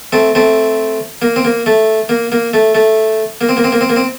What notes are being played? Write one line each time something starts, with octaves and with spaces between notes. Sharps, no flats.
A3 C4
A3 C4
A#3
C4
A#3
A3
A#3
A#3
A3
A3
A#3
C4
A#3
C4
A#3
C4
A#3
C4